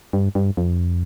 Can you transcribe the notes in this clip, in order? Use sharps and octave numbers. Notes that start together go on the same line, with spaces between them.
G2
G2
F2